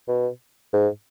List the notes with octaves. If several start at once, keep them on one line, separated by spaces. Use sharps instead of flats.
B2
G#2